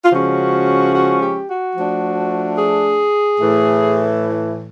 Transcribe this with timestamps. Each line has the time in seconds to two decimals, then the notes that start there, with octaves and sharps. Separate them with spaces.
0.04 F4
0.11 C#3 F3 G#3 C#4 F#4
0.94 F#4
1.22 G4
1.49 F#4
1.76 F3 A3 D4
2.58 G#4
3.40 A2 E3 A3